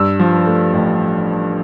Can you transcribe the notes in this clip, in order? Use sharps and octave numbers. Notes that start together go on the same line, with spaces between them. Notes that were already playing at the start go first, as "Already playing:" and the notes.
Already playing: G2 E6
F3
A3
A1